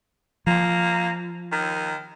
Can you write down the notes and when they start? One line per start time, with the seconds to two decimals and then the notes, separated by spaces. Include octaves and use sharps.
0.47 F3 A#3
1.52 D#3